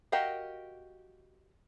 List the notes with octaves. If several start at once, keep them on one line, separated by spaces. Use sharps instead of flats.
F#4 G4 A#4 D#5 F5